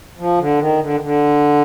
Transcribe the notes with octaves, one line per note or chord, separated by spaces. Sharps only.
F3
D3
D#3
D3
D#3
D3